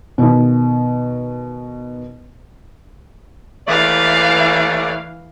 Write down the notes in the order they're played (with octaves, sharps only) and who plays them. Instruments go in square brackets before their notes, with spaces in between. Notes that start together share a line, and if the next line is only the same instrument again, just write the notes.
[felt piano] B2 D#3
[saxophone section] D#2 A3 D5 [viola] E3 F5